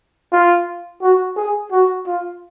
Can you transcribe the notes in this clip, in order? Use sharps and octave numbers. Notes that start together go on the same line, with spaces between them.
F4
F#4
G#4
F#4
F4